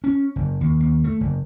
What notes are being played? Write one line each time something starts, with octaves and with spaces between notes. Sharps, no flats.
C#4
F#1
D#2
D#2
A3
F#1